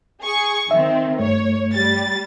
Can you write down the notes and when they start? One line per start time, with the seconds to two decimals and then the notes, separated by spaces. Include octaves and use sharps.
0.22 G#4 C#6
0.71 D#3 C4 E5
1.19 G2 A3 C#5
1.75 G3 A6